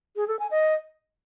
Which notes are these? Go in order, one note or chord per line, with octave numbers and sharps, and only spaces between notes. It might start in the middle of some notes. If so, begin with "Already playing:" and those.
G#4
A4
G#5
D#5